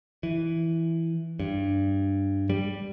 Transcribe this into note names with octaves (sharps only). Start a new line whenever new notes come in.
E3
G2
G3